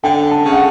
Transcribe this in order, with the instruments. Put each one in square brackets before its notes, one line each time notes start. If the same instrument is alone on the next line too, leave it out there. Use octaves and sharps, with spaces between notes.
[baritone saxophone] D3 [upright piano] G5
[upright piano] A5
[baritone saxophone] C#3
[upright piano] F#5